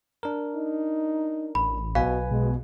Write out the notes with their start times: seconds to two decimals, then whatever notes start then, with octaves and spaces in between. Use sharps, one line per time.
0.23 D4 A#4
0.55 D#4
1.55 A1 B5
1.95 B1 B2 B4 F5 G#5
2.31 B2 G#3